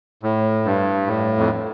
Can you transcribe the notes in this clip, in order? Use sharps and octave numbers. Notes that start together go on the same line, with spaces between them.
A2
G2
A2
F2